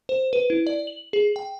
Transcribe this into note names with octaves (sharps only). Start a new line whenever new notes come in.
C5
B4
E4
D5
F#7
G#4
G5